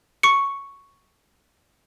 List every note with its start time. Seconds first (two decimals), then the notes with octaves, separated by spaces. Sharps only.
0.23 C#6 C#7